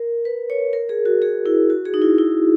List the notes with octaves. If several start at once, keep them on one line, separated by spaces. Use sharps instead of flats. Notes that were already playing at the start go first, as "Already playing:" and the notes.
Already playing: A#4
B4
C#5
A#4
G#4
F#4
G#4
E4
F#4
G#4
D#4
E4
E4